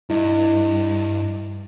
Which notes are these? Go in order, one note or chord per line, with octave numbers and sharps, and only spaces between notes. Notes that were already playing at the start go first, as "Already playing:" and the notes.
G2 E4 D#5